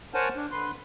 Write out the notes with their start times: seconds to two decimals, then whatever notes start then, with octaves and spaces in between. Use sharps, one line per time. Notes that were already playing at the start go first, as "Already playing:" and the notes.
0.14 A#4 C5 C#5 F#5 G#5 A5
0.36 D4
0.52 D3 B4 C6